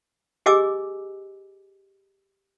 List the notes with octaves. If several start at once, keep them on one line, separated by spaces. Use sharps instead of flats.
G4 G#4 D#5 G#5 D6 E6